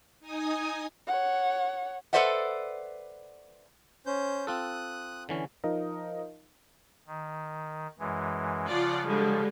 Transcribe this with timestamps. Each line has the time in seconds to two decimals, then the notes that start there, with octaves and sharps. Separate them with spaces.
0.20 D#4 G#5 D#6
1.07 C#5 F#5
2.13 A4 B4 C5 D5 E5 F#5
4.06 C#4 C5 G6
4.47 C4 F4 A4 D#6 F#6
5.29 D3 E3 C#4
5.64 F3 D#4 A#4 D#5 F5
7.07 D#3
7.99 F#2 E3 G#3
8.69 C#3 F3 F4 D5 F#5
9.07 D3 G3 G#3